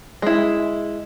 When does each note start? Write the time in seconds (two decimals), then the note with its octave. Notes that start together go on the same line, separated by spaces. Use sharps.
0.22 G#3 E4